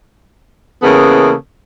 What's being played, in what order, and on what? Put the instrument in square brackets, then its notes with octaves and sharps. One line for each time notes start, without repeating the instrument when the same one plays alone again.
[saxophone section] C#3 E3 A#3 B3 A4